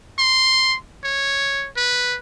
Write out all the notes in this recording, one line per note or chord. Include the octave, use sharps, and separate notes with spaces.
C6
C#5
B4